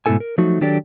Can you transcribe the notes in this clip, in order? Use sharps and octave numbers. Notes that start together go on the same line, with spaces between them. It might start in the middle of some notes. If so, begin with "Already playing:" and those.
G#2 B2 A3 E4 A4 G#5
A#4
F3 F#3 A3 D#4 F#4
D#3 F#3 D4 G4 A4 D5